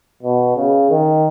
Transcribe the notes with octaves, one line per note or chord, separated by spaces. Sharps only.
B2
C#3
D#3